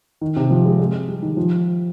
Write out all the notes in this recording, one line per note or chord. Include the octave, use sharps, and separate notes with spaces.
D#3
C3
F3
G#3
G#3
G3
D#3
F3